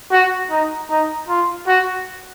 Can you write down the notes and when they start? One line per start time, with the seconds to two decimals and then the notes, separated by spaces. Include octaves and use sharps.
0.11 F#4
0.50 D#4
0.90 D#4
1.28 F4
1.67 F#4